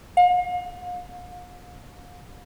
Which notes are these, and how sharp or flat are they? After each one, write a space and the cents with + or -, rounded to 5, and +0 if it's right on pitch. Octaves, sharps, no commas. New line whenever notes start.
F5 +40